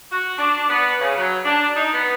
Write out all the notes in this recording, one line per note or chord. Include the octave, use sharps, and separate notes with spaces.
F#4
D4
B3
C#3
F#3
D4
D#4
B3